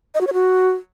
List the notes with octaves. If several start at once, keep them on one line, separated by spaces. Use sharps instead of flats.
D#5
F#4
C#5
F#4